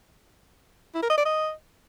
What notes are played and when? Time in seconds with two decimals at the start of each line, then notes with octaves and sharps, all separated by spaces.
0.95 E4
1.02 A#4
1.10 D#5
1.18 D5
1.25 D#5